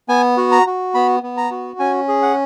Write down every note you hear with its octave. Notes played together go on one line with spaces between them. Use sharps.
B3 G#5
F#4
A#5
F#4
B3 B5
B3
A#5
F#4
C#4 G#5
G#4
F#5